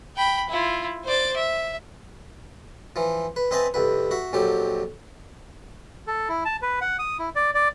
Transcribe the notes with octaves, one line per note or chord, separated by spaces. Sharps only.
G5 B5
E4 F4
C5 D5
E5
E3 F3
B4
C4 B4 D#5 E5 G#5 A5
C2 F2 B4
F#4 E5
A#1 F2 F#3 G4
A4
E4
A5
B4
F#5
D#6
E4
D5
D5